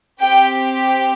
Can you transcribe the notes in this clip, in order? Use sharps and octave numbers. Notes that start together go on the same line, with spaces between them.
C4 G4 G5